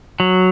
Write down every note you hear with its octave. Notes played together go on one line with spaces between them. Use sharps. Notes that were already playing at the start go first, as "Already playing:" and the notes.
F#3